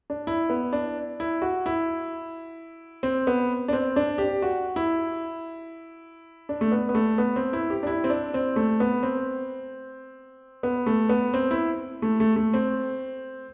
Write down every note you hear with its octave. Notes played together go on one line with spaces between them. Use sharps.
D4
E4
B3
D4
E4
F#4
E4
C4
B3
D4
C4
D4
G4
F#4
E4
D4
A3
B3
B3
A3
B3
C4
E4
G4
D4
E4
C4
D4
C4
A3
B3
C4
B3
A3
B3
C4
E4
A3
A3
A3
C4